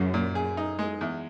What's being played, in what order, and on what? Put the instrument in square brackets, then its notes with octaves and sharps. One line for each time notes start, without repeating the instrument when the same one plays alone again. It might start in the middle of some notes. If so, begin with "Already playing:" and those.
Already playing: [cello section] F#2 [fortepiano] C#3
[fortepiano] A#2
G#4
D#4
G#3
E2